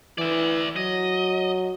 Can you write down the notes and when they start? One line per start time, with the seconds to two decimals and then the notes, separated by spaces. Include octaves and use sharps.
0.18 E3 D5 E5
0.76 F#3 D#5